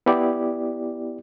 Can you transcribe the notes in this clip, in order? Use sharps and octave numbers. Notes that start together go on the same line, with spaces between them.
B3 E4 G4 D5